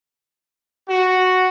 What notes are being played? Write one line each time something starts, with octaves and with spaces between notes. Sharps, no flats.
F#4